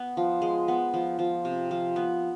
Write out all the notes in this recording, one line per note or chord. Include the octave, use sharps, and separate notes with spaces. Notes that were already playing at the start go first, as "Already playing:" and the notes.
Already playing: B3
F3
G#3
B3
F3
F3
C3
F3
B3